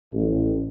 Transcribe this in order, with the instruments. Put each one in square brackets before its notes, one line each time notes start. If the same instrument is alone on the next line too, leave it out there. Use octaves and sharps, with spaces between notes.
[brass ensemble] A1